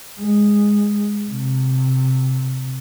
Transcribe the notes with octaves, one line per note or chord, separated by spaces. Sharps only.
G#3
C3